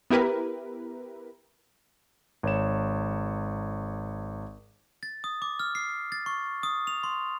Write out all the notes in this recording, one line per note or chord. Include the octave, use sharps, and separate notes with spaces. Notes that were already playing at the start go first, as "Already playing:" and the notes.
B3 E4 G4 A#4 B4
G#1 C#5 E7
A6
D#6
D6
F6
C7
A6
C#6
D#6
F7
C6